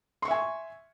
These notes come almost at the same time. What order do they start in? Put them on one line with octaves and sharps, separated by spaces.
C6 C#6 E5 G#5